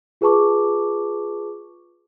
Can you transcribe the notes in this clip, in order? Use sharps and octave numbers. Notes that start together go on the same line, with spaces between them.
F4 G#4 B4 A5 C#6 D6